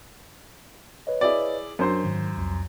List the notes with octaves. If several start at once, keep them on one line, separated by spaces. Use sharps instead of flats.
B4 C#5 D#5
E4 G#4 D5
F#2 D4 A#4 C5 C6
G#2 D#3
C2 F2